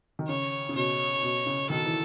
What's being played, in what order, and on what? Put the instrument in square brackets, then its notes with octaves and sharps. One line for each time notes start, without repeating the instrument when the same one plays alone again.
[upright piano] D#3
[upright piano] C#3 [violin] C#5
[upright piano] C#3
[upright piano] B2 [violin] C#5
[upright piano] B2
C#3
[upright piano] B2 D#3 [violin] A4
[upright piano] E3